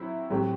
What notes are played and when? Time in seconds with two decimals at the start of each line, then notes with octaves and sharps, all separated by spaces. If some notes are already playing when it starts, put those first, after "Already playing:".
Already playing: F#3 C4 E4
0.30 A2 F#3 C4 G4